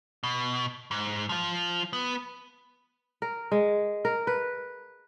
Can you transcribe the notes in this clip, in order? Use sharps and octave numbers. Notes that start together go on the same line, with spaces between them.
B2
G#2
F3 F4
B3
A#4
G#3
A#4
B4